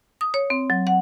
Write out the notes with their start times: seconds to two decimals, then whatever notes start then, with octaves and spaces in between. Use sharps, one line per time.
0.21 D#6
0.34 C#5
0.50 C4
0.70 F#3
0.87 F#5